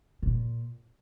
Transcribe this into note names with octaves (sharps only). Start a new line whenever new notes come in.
A#2